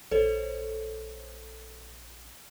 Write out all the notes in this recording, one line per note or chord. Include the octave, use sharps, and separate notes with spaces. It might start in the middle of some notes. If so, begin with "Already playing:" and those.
A#1 A4 C5 C#5